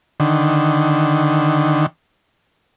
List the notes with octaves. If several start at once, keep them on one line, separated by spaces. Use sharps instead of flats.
D3 D#3